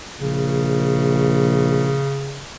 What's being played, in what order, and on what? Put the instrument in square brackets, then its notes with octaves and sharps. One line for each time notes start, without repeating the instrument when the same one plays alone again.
[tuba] A#1 [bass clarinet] C#3